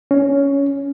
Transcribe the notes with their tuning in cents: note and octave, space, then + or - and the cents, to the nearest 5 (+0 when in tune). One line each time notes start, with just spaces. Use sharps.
C#4 +10